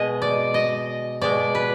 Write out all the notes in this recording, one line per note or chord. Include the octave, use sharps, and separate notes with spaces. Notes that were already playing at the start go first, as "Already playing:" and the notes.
Already playing: B2 G#3 D#5
D5
D#5
B2 G#3 D5
B4